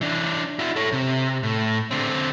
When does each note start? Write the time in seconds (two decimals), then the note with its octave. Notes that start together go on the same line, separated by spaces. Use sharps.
0.01 E3 D4
0.59 E4 F#4
0.76 A4 C#5
0.92 C3
1.43 A2
1.91 D3 C4